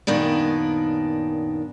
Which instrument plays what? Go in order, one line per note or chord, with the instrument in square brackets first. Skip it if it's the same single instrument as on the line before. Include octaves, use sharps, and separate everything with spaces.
[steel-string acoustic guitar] F#2 A#2 D#3 B3 D4